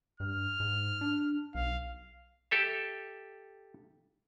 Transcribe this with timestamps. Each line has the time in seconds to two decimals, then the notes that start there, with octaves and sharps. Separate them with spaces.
0.20 G2 F6
0.60 G#2
1.01 D4
1.55 B1 F5
2.51 G4 A4 E5